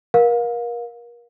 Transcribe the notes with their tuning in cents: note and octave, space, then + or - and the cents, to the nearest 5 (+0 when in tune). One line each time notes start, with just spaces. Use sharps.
A#4 +35 F5 +30